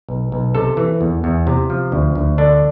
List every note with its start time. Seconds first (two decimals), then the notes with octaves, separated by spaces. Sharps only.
0.09 B1
0.32 B1
0.55 C3 A4
0.77 E3
1.01 E2
1.24 E2
1.47 C3
1.70 F3
1.92 D2
2.15 D2
2.38 D3 D4